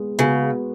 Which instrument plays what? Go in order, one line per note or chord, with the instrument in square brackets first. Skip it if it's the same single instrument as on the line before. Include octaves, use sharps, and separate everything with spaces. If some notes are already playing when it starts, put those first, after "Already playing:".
Already playing: [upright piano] G#3 B3
[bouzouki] C#3 [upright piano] B3 F#4